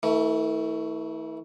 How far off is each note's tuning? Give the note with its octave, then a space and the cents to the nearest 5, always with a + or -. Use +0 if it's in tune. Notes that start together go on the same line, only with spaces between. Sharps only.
E3 -30 A3 +25